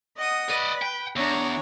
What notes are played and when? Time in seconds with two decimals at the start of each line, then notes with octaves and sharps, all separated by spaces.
0.16 D#5 F#5 D#6
0.50 B4 D5 D#5
0.82 G5
1.16 E2 D4 C#5 A#5